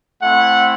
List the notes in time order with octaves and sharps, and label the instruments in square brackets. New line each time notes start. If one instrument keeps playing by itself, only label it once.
[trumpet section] A3 C4 E4 F#5